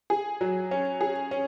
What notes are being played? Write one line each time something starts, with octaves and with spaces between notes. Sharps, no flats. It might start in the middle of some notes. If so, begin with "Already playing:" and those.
G#4
F#3
C#4
G#4
C#4